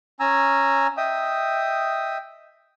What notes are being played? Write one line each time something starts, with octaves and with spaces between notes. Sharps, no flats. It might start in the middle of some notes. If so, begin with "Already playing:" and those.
C#4 G#5 A#5 E6
D#5 E5 G5 D#6